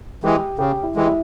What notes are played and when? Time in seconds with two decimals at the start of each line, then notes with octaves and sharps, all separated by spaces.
0.24 E3 G#3 G4
0.59 C#3 G4
0.83 E4
0.96 E3 G#3 G4
1.07 E4